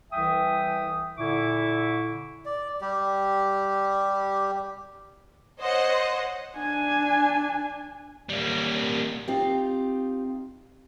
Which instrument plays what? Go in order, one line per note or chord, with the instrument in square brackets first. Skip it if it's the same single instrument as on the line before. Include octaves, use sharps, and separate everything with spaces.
[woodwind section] C2 E3 E5 G5 G#5 D#6
A#2 D3 E4 E5 C#6 D6
[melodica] D5
G3 G4
[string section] C5 C#5 D#5 F#5
[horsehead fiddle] D4 G#5
[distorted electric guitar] G3 A#3
[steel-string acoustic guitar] C4 D#4 F4 G4 F5